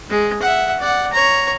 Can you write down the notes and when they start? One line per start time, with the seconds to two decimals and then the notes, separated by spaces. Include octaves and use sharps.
0.10 G#3
0.42 E5 F#5
0.79 D5 F#5
1.13 C#5 A#5